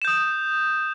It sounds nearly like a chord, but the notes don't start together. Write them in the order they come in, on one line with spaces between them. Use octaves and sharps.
E7 G6 D#6